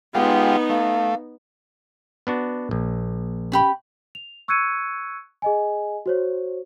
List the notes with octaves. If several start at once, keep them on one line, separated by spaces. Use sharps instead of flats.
G#3 B3 D#4 F4 G4 F#5
A3 F5
B3 D4 F#4
A#1
C#4 G4 B5
F7
C#6 E6 F#6 G#6 C#7 D#7
G#4 D#5 G#5
F#4 C5 C#5